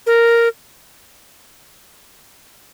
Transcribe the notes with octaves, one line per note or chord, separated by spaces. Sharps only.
A#4